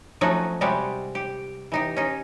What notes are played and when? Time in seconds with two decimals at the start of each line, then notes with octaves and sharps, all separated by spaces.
0.21 F3 F#3 A3 C#4 D#4 F#4
0.61 C3 G3 G#3 F#4 G4
1.15 G4
1.72 E3 D#4 G4
1.97 C#4 D#4